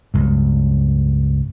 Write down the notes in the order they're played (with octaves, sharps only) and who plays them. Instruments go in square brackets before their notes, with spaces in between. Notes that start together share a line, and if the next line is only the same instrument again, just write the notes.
[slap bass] C#2 G2